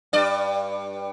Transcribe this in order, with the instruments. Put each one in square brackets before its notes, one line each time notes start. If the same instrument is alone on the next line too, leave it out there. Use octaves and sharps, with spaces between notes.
[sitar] G2 D5